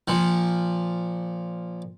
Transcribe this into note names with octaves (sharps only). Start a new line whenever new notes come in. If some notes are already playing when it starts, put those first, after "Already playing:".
A#2 F3